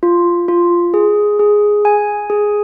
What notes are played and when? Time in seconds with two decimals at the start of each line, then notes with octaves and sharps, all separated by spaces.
0.03 F4
0.48 F4
0.94 G#4
1.39 G#4
1.85 G#5
2.30 G#4